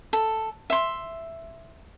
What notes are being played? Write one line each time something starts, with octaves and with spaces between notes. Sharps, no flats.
A4
E5 C6